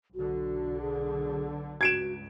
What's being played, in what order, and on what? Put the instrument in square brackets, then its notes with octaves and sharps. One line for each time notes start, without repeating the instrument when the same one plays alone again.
[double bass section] B1 D3 [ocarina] F#4
[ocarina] G#4
[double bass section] C#2 G2 [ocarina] F#4 [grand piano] G#6 D7 E7